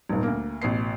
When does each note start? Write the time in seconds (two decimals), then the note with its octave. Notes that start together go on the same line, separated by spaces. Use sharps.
0.09 D#1 G#1
0.23 D2 A#3
0.62 A1 B2 C7